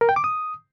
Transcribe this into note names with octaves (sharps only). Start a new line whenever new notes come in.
A#4
G5
D6
D#6